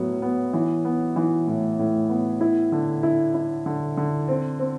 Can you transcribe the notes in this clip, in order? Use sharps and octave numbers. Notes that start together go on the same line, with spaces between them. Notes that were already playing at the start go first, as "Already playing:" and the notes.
Already playing: A2 F#3 B3
B3
E3
B3
E3
A2
A2
B3
E4
D3
E4
E4
D3
D3
C4
C4